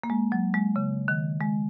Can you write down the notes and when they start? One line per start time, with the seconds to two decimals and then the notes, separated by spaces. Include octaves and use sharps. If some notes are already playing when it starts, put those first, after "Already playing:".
0.04 A#3
0.10 G#3
0.32 F#3
0.54 G#3
0.76 C#3
1.08 D#3
1.41 G#3